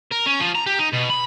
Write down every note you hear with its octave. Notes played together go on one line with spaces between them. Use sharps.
A#4
C#4
F3
A#5
G4
D#4
B2
B5